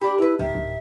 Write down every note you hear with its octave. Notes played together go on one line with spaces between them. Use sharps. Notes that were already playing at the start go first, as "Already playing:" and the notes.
D4 G4 B5
E4 A#4 B4
D1 D#3 E5
D1